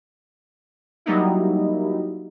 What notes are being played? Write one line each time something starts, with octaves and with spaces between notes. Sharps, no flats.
F#3 G3 A#3 D#4 E4